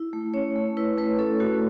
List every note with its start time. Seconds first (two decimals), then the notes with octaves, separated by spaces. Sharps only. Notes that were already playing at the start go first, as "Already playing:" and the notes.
Already playing: E4
0.13 A3
0.34 C#4 C#5
0.56 A3
0.77 E4 B4
0.98 A3 B4
1.19 C#4 A4
1.40 A3 F#4